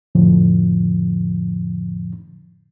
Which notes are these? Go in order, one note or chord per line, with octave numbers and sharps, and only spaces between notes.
F2 A2 D3 F3